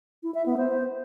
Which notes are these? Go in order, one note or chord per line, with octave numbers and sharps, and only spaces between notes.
E4
E5
B3
C5